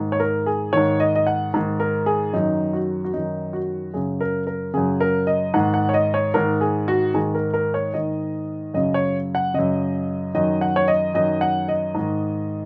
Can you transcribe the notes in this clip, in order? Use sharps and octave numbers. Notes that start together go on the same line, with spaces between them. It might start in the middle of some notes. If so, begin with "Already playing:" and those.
Already playing: G#2 D#3
C#5
A#4
G#4
G#2 D#3 C#5
D#5
D#5
F#5
G#2 D#3
A#4
G#4
F#2 D#3 D#4
F#4
F#4
F#2 D#3 D#4
F#4
F#2 C#3 G#4
A#4
A#4
F#2 C#3 G#4
A#4
D#5
G#2 D#3 F#5
F#5
C#5
D#5
C#5
G#2 D#3 A#4
G#4
F#4
G#2 D#3 G#4
A#4
A#4
C#5
G#2 D#3 D#5
F#2 C#3 D#5
C#5
F#5
F#2 C#3 D#5
F#2 D#3 D#5
F#5
C#5
D#5
F#2 D#3 D#5
F#5
D#5
G#2 D#3